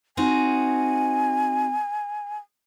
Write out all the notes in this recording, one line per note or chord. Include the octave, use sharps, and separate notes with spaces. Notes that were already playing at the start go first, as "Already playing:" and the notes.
C4 D#4 F#4 G#5